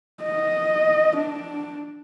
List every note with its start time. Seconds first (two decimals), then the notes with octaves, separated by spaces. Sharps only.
0.24 D#5
1.17 D4